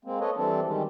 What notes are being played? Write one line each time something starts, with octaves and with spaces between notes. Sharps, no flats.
G#3 A#3 C4
A4 B4 C#5 D#5
E3 G3 C4 D4 A4
D#3 G3 G#3